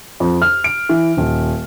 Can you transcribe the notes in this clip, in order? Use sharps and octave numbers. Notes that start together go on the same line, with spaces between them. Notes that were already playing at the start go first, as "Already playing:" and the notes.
F2
F6
D7
E3
D#1